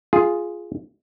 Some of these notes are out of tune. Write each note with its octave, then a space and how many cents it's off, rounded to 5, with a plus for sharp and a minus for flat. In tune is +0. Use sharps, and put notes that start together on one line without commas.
F4 +0 G#4 +0